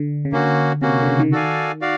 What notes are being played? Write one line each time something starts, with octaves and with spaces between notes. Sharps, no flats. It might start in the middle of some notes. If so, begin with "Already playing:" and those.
Already playing: D3
C#3
D3 A#3 C#4 F#4
C3 A#3 C#4 F#4
D3
C#3
D#3
F#4 A4 D5 F5 G#5
F#4 D5 F5